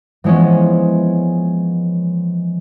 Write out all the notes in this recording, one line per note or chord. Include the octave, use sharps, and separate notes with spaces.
E3 F3 G#3 B3 C#4